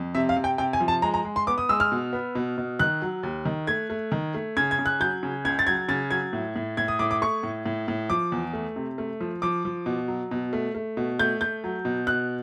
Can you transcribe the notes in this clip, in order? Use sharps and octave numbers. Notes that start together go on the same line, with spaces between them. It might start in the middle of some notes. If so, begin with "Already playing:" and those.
Already playing: F2
C3 E5
F5
C3
G5
C3 G5
G#5
F3
A5
G#3 A#5
A#5
G#3
C6
B3 D6
D#6
G#3 E6
F6
B2
B3
B2
B2
D#3 F#6
F#3
D#2
D#3
A3 G#6
A3
D#3
A3
C#3 G#6
G#6
C#3
F#6
F#3 G6
C#3
C#2 G#6
A6
F#3 G#6
C#3 A6
F#3 G#6
A2
A2
A2 G#6
D#6
A2 D6
D6
A3 C#6
A2
A2
A2
F3 D6
E2
A3
C3
A3
F3
F3 D6
F3
B2
F#3
B2
A3
A3
B2
A3 G6
A3 G6
F#3
B2
B2 F#6